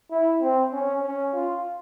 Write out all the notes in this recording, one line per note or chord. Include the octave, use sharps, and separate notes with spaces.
E4
C4
C#4
C#4
F4